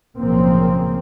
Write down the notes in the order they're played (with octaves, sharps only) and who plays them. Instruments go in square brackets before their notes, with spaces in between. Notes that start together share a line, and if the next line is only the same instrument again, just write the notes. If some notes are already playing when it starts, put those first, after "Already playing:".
[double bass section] B1 A2 C#3 F3 A#3 C4